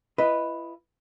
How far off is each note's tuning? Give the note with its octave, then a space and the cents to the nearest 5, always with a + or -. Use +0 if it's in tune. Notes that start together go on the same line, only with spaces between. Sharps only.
E4 +35 B4 +0 D#5 +5